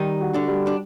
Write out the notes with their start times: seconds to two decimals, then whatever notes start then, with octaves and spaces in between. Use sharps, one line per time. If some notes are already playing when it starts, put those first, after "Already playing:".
Already playing: D#3 G3 D#4
0.21 F#4
0.34 D3 D4
0.48 G3
0.67 D4